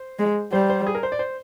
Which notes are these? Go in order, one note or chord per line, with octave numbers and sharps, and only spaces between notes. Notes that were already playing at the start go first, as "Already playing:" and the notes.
Already playing: C5
G#3
G3 C5
C5
G#4
A#4
C5
D5
C5